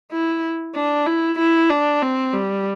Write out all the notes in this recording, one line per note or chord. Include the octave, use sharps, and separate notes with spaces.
E4
D4
E4
E4
D4
C4
G3